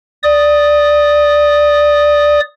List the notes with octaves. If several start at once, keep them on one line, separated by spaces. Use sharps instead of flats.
D5 D#6